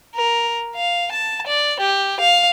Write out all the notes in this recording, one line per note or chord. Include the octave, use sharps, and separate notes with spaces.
A#4
F5
A5
D5
G4
F5